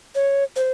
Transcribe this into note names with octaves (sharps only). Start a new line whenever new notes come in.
C#5
C5